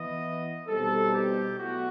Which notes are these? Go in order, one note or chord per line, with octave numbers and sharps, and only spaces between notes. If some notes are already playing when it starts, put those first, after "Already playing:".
Already playing: E3 B3 E4 D#5
B2 G3 C4 D#4 A4
G4
B2 F#3 A3 E4 F#4